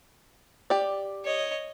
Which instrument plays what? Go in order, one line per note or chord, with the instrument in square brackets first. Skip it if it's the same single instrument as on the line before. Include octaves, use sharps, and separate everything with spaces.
[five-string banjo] G4 D5
[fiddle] C#5 D#5